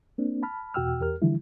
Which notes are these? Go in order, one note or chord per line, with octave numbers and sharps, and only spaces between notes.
A#3 C4 D4
A5 B5 F6
E2 B2 F#4 G5 E6 F6
E2 G4 A#4 F6
D3 E3 F3 G3 E4